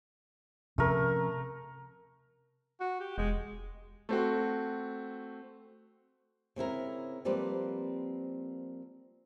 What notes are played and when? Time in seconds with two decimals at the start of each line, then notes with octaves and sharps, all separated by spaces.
0.78 C3 F3 A3 C#4 A#4
2.81 F#4
3.00 G4
3.18 E1 G#3
4.09 A3 C4 F#4
6.56 C#3 C4 E4 A#4
7.25 F3 G3 A#3 C4 B4